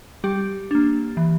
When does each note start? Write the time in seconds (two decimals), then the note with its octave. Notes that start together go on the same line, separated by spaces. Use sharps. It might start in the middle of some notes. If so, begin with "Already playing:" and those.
0.24 G3 G4
0.71 A#3 D4
1.17 E3